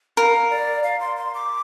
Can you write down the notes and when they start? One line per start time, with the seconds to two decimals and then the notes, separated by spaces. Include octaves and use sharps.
0.17 A#4 F5
0.50 D5
0.83 F5
1.00 C6
1.17 C6
1.35 D6